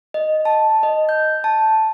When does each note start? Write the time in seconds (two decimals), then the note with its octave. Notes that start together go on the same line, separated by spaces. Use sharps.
0.14 D#5
0.45 A5
0.83 D#5
1.09 G6
1.44 A5